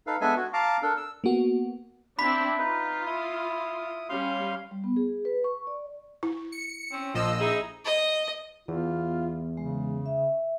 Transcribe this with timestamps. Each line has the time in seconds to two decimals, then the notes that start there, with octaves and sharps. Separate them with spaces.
0.07 D#4 A4 B4 F5
0.21 G#3 B3 D4 A4 E5 G#5
0.37 F#4
0.53 F5 A5 A#5 D6
0.82 D4 A4 A#4
0.97 E6
1.24 A#3 B3 F#4
2.19 C4 D4 E4 B5 B6
2.59 D#4 F4 B4
3.06 E4 D#6
4.09 G3 C#4 F5 C6
4.71 G3
4.84 B3
4.96 G#4
5.25 B4
5.44 C#6
5.67 D5
6.23 E4
6.52 C#7
6.92 C4 C#4
7.14 A#1 F3 D#5 E6
7.40 D#4 E4 G#4
7.85 D#5
8.68 E2 B3 F4
9.57 C#3 G#3
10.06 E5